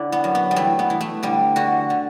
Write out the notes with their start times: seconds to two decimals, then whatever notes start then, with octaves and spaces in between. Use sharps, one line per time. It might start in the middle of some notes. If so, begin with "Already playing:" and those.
Already playing: D3 D4 E4
0.12 B3
0.24 F#2
0.35 B3
0.51 G3
0.56 E3 A3
0.79 B3
0.90 E3
1.01 A3
1.23 D3 G3
1.56 D3 F#4
1.90 D3